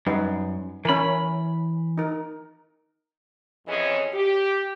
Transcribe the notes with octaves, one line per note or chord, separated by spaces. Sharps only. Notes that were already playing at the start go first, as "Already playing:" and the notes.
F#2 G3 D#4 B4
E3 C#4 A#4 B5
D#4 A#4
F2 E3 C#4 G#4 C#5 D#5
G4